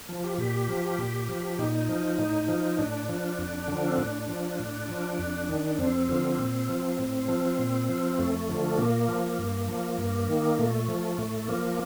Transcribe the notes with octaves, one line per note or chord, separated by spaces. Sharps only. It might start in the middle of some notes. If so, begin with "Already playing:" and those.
F3
G4
A#2 G4
F3
A#2
F3
A#2 D#4
F3
A2
F3
A2 D4
F3
F2
D3 F3
C4
A2 D4
F3
A2
F3
F2
D#3
F2 C4
D3 F3
A#2
F3
A2
F3
A#2
F3
F2 A3
D3 F3
A#2 A#3
F3
G2
F3
G2
D#3
A#2 A3
F3
A2 A3
F3 A#3